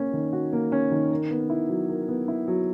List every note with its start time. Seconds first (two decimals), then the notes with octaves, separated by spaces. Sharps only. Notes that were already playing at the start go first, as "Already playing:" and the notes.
Already playing: A#3 C#4
0.13 D#3
0.33 F#4
0.53 A#3
0.72 C#4
0.91 D#3
1.11 A#4
1.31 B3
1.50 E4
1.69 F#3
1.89 A#4
2.08 B3
2.28 E4
2.48 F#3